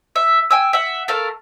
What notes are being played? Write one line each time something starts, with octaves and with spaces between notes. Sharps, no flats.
E5
G5 G#5 E6
E5 F#5
A3 A4 A#4 F5